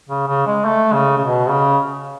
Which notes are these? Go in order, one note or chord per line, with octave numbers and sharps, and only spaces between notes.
C#3
C#3
G#3
A3
C#3
C#3
B2
C#3